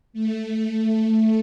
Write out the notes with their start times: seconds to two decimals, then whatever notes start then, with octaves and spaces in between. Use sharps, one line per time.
0.13 A3